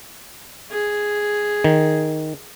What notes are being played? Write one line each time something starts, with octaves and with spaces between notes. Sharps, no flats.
G#4
D#3